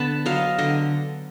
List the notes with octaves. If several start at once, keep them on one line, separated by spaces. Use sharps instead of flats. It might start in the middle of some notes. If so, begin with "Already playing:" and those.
Already playing: D3 B3 A5 B5
F#3 D#5 F5
D3 D#5